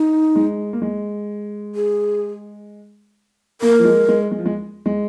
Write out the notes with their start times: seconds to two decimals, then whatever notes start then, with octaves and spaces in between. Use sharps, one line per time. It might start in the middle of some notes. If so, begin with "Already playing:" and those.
Already playing: D#4
0.36 G#3
0.73 A#3
0.82 G#3
1.75 G#4
3.61 A#3 A#4
3.79 F3
3.85 G#3
4.09 G#3
4.31 G#3
4.39 F3
4.46 G#3
4.86 G#3